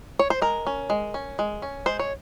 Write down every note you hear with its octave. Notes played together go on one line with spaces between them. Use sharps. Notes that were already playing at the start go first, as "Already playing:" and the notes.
C#5
C5
G#3 A#4
C#4
G#3
C#4
G#3
C#4
G#3 C5
C#5